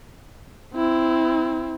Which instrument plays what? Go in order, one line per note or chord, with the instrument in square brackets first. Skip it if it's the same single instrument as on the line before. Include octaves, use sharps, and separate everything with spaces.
[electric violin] C4 E4